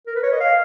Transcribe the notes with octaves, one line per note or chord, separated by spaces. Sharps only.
A#4
B4
C#5
D#5
F5